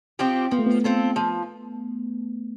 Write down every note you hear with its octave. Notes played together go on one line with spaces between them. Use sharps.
F3 C4 G4
F3 B3
A3
B3
C4 F4 A4
F3